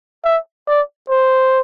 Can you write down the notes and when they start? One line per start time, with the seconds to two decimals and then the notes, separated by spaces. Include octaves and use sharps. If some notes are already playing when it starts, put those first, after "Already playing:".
0.24 E5
0.68 D5
1.09 C5